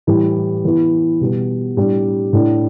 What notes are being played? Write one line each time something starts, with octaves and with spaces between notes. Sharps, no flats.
A2 E3 G3 E4
E3 B3 E4
B2 G3 B3
A2 G3 D4
A2 A3 D4